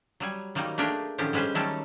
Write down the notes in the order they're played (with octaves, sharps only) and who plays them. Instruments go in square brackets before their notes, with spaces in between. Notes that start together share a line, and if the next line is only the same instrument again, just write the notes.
[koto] F#3 G3 G#5
D#3 F#3 G3 A#3 D#4
A3 A#3 D4 G4 G#4 A#4
A2 D3 D#3 F3 C#4 G4
G3 G#3 C#4 B4 C5
D#3 F#3 G3 A3 C#4 A4